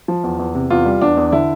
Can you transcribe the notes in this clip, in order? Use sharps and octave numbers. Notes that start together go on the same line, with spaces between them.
F3
E2
E2
C3
E2 F4
G3
E2 D4
E2
D3 E4